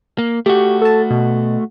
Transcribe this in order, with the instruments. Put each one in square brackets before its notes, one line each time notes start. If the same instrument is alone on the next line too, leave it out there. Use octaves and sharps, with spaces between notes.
[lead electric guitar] A#3
[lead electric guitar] A3 F#4 [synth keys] G4
[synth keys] A4 A5
B2